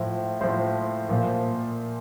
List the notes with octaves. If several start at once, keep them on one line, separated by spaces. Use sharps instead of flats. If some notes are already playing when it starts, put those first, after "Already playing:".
Already playing: A2 F3
A2 F3 C5
A#2 F3